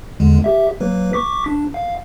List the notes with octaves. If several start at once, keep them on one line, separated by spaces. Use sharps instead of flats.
E2 D3 G#3
G4 E5
F#3 A#3 B4
C#6 D6 B6
D4
F5